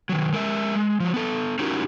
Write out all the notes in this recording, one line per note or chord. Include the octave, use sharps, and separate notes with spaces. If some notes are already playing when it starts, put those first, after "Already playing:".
D#3 F#3
G#3 A#4 E5
G#3
F3 F#3
B3 A4
C#4 D#4 E4 F#4 G4 A#4